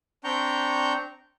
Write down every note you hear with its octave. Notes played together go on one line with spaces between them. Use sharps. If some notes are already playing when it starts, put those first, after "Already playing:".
C4 D4 G5 A#5 C#6 G6